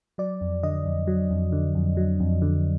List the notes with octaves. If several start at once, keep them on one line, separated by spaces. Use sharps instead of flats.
F#3 D5
F2
D3 D#5
F2
F#3
F2
D3
F2
F#3
F2
D3